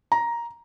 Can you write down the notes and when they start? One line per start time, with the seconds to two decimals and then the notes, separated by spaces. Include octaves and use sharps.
0.12 A#5